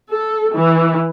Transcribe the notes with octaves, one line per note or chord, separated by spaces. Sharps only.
A4
E3